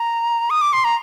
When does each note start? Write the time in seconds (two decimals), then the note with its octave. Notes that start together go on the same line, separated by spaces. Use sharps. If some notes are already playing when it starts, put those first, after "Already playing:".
Already playing: A#5
0.50 D#6
0.61 D6
0.73 C6
0.84 A#5